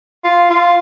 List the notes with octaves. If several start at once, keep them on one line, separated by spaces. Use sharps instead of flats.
F4
F4